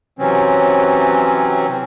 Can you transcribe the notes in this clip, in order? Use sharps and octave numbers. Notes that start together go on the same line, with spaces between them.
C3 E3 F#3 C4 C#4